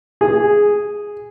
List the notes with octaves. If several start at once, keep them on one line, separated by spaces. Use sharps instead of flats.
G#4